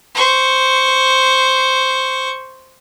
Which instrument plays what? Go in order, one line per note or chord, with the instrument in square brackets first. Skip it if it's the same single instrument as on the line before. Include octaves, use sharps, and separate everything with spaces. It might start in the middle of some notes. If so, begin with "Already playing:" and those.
[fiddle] C5 C#6